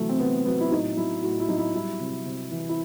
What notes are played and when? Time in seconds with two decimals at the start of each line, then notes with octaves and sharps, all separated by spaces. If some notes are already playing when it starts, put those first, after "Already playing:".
Already playing: C3 E3 F#3 A3
0.09 C4
0.19 C3 B3
0.46 F#3 B3
0.60 E4
0.71 A2 D#4
0.97 F#3 E4
1.23 A2 F#4
1.39 E4
1.49 F#3 D#4
1.58 E4
1.74 G3 E4
2.00 C3
2.25 C3
2.51 E3
2.69 E4